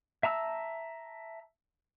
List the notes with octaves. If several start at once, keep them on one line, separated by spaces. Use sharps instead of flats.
E5 A5 A#5 E6